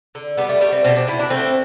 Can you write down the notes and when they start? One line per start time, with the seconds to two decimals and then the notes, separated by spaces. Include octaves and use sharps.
0.15 D3
0.37 G3 B3
0.49 A3
0.61 G3 A3
0.72 C4
0.84 B2 C4
0.96 D4
1.08 B2 E4
1.19 D4
1.30 A3 C4